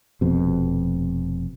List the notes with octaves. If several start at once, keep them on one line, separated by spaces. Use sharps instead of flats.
F1 F2 B2